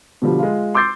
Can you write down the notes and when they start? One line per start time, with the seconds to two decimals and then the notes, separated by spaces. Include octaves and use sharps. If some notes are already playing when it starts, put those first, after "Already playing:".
0.22 B2 D3 F3 G3
0.39 G#3 F4
0.74 C6 D6 E6 G6 A6 C7